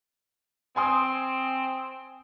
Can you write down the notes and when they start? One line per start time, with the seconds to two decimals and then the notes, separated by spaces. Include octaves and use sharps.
0.76 C4 G#5 C6 D#6